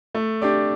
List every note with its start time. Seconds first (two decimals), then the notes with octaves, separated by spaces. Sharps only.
0.15 A3
0.42 D4 G4 D5